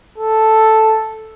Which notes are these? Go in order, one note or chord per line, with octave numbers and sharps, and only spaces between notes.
A4